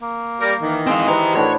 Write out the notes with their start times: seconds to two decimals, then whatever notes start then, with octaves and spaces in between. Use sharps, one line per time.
0.02 A#3
0.41 G3 A#4
0.62 D#3 E3
0.87 G#3 C4 F5
1.08 G4 G#4 B4 C5 A#5
1.35 A2 D4 E4 F#4 C#5